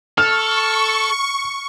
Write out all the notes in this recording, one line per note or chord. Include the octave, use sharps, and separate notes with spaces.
A4 C#6 F6